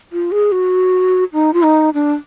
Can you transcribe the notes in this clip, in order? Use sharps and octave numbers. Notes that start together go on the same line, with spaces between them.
F4
G#4
F#4
D#4
F4
D#4
D4